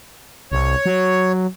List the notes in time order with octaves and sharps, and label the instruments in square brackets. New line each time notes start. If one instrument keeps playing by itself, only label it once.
[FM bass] C2 [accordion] C#5
[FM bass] F#3